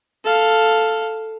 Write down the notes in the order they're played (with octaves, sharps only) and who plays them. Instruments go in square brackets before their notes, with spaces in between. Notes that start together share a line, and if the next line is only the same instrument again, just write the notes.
[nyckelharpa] A4 F5